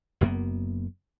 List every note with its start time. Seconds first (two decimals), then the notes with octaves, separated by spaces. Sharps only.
0.21 F#1 F#2 A#3 B3